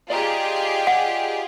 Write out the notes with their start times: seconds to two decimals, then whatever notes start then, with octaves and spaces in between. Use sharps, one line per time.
0.10 F4 G4 G#4 D5 D#5 A#5
0.87 F#5